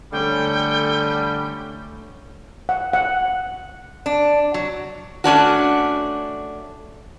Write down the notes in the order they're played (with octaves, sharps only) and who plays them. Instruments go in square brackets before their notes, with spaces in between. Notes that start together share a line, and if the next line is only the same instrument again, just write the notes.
[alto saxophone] D3 [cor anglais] G3 [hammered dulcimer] A3 C#4 [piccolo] G5
[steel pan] F#5
F#5
[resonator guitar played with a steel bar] D4
F#3
A3 C#4 D4 F#4